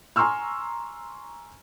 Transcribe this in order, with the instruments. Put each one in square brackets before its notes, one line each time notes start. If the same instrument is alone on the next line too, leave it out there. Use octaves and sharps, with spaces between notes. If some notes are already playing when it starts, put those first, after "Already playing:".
[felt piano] G#5 A#5 C6 C#6 E6 F6